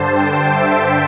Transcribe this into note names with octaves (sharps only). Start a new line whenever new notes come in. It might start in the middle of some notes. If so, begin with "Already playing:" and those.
Already playing: G2 D3 C5 A5
G5
E5